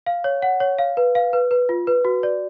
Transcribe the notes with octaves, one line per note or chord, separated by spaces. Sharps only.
F5
C#5
F#5
C#5
F5
B4
F5
B4
B4
F4
B4
F#4
D5